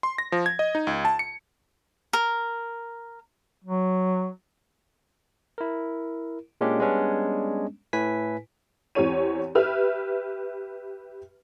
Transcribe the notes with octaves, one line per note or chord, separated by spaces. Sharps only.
C6
A#6
F3
G#6
D#5
D#4
C#2
A5
C#7
A#4
F#3
E4 A#4
A#2 G#3 A#3 C#4 D4 G4
G3 G#3 B3 C#4 D4
A2 E4 B4 G#5 B6
E2 C4 G4 C#5 D#7
G4 B4 E5 F6